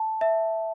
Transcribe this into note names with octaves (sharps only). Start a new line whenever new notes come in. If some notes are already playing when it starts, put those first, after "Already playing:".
Already playing: A5
E5